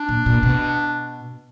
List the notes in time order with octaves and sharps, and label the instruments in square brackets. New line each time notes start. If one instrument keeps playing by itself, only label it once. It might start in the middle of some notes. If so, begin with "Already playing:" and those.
Already playing: [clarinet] D4
[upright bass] A#2
A#2
B2